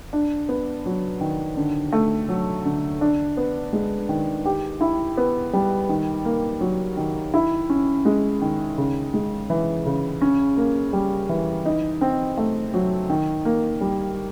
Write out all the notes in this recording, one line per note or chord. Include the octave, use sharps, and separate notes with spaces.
D4
B3
F#3
D#3
D3
A3
F#3
D3
D4
B3
G#3
D#3
G4
E4
B3
G3
D#3
A#3
F#3
D#3
E4
C#4
G#3
D#3
C#3
G#3
E3
C#3
C#4
A#3
G3
E3
D#4
C4
A3
F#3
D#3
A#3
G3